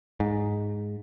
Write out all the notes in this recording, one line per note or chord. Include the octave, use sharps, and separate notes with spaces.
G#2